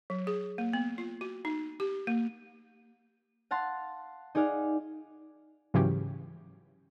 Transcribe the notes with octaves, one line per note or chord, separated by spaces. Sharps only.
F#3
G#4
A#3
B3
F4
F#4
D#4
G4
A#3
F5 F#5 A5 C6
D#4 G#4 D5 F5 F#5
G#2 C#3 E3 F#3 C#4 G4